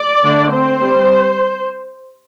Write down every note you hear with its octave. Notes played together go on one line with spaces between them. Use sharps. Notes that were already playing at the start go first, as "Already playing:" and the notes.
Already playing: D5
D3 A3 D4
C4 C5
G3 C4